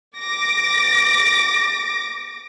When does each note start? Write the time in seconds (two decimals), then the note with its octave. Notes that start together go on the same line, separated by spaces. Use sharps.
0.18 D6 A#6